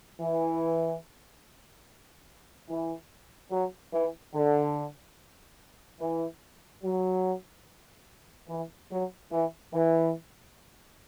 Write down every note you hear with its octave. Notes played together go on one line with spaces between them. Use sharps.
E3
E3
F#3
E3
D3
E3
F#3
E3
F#3
E3
E3